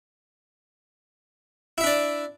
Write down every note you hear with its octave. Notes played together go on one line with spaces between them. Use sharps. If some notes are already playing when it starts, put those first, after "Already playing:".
D4 E4 D5 E5